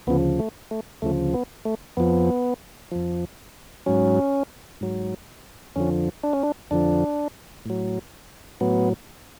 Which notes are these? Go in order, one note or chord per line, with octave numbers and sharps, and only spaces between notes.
D2 C#3 F3 B3
A3
A3
D2 C#3 F3 A3
B3
A3
F2 F3 B3
F2 F3
G#2 F#3 C#4
G#2 F#3
F2 D3 F3 C#4
D4
C#4
D4
F2 D3 F3 D4
A2 F#3
A2 F#3 B3